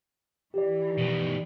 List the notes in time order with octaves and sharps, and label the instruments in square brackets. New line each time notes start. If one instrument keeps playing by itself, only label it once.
[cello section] E3 [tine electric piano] G4 D5
[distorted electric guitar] B2 D#3